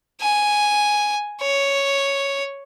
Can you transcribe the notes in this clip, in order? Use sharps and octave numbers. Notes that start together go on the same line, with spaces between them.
G#5
C#5